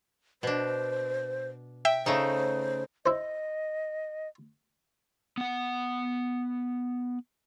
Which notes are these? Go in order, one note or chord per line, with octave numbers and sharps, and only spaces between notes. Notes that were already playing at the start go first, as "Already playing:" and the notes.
B2 D4 C5
E5 G5
C#3 A3 D#4 C5
E4 C5 D#5
B3 F#5